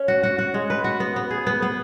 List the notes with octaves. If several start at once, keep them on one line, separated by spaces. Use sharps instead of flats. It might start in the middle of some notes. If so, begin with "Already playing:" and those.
Already playing: C#4
F#4
F#4
F#4
G#3
B4
F#4
B3
B3
G#4
B3
B3